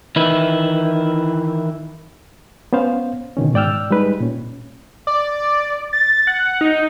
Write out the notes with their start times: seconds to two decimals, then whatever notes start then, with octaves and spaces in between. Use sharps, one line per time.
0.16 D#3 E3 E4
2.73 B3 C#4 C5 F5
3.37 B2 D3 D#3 C#4
3.54 G#2 D5 G5 E6 F6
3.91 G3 G#3 D#4 B4
4.20 A#2 C#4
5.07 D5
5.93 A6
6.27 F#5
6.61 D#4